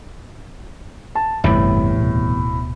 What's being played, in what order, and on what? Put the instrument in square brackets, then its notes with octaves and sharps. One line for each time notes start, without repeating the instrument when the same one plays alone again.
[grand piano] A5
[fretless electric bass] G1 [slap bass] E2 C3 G3 [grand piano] A2
[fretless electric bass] D1 B2